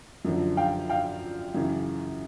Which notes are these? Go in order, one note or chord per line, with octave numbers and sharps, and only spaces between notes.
F#2 D3 F3
F5 G5
F5 G5
F#2 C#3 E3